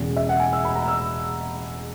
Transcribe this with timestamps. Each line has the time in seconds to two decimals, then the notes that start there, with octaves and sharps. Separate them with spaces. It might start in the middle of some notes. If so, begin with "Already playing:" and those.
Already playing: E1 E2 C#3 E3
0.16 E5
0.29 F#5
0.40 G#5
0.53 E6
0.65 B5
0.76 A#5
0.88 E6